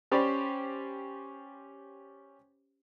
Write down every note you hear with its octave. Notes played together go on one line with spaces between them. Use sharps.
C#4 G4 C5 D5 B5